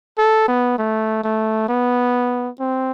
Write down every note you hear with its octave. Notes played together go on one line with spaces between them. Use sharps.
A4
B3
A3
A3
B3
C4